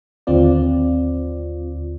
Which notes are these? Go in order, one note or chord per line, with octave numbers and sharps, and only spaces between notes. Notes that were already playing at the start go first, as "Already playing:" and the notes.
D#2 D3 C4 F4 D5